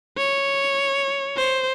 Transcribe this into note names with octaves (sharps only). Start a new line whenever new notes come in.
C#5
C5